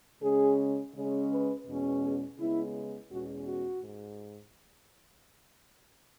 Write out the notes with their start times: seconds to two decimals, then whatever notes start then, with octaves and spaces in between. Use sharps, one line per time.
0.23 C#3 G#3 C#4 G#4
0.95 C#3 G#3 C#4
1.31 B4
1.67 E2 B2 G#3 C#4
2.03 G#4
2.39 C#3 G#3 B3 E4
3.11 E2 B2 G#3 C#4 F#4
3.47 F#4
3.83 G#2